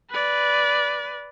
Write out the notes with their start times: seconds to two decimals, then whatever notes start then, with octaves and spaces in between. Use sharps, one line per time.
0.11 B4 D5